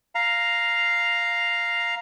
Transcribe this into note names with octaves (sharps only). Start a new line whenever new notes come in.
F5 A#5